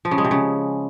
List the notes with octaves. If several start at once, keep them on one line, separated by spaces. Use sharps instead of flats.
F3
C#3
G#3
C3
C#3